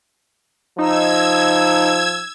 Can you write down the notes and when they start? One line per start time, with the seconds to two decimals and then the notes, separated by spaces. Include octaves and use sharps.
0.78 F3 D#4 E6 G#6